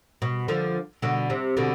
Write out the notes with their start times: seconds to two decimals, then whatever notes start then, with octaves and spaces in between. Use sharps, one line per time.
0.22 B2
0.48 D3 F3
1.02 B2 D3
1.30 C3
1.57 B2 D3